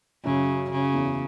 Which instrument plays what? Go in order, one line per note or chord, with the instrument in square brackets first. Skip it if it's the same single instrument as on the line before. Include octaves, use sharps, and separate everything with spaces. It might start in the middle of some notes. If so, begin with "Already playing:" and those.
[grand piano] F#2 F#3 [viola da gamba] C#3
[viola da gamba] C#3
[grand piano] E2 E3